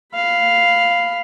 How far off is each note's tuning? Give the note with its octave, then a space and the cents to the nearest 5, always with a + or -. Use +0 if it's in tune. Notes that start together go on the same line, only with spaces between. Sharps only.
F5 +0 B5 +10